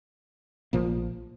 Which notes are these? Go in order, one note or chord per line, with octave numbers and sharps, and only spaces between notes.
A#1 A#2 F3 A#3